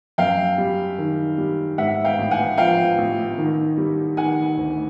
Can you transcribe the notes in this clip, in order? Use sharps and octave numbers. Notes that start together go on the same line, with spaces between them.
F#2 F5 G5
G3
D#3
G3
G#2 E5 F#5
F5 G5
A1
F#5 G#5
F3 F5 G5
A1
D#3
G3
D#3 F#5 G#5
D2